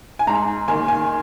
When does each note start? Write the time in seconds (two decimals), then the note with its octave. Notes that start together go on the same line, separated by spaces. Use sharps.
0.19 G#5
0.27 G#2 A#5
0.68 D#3 A#3 G#5
0.88 G#5